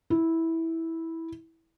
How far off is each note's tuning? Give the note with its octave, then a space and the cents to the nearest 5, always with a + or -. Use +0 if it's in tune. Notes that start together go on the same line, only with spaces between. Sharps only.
E4 -10